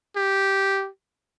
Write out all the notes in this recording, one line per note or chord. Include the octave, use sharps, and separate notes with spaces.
G4